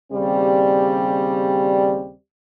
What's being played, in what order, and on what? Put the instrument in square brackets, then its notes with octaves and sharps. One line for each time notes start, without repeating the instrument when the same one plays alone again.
[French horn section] D#2 C#3 G3 C4 G4 D5